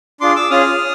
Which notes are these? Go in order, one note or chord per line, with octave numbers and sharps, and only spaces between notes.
D4 F4 G#4 C6 D6
D6 E6
C#4 F4 G#4 D#6 F6